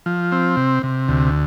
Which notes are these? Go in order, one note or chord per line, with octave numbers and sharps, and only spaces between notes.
F3
C4
C3
C3
D2